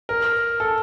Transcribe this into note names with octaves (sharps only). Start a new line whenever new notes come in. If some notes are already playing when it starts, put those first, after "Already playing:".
A#4
A4